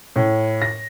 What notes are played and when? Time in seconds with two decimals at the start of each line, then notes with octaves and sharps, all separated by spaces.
0.16 A2
0.62 A#6